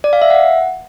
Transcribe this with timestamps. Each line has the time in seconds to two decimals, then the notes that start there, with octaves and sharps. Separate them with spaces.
0.04 D5
0.13 F5
0.22 E5
0.30 F#5